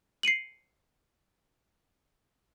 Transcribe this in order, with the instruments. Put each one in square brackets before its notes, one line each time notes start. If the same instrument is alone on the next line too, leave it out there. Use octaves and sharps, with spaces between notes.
[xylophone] C7 C#7 D#7 F#7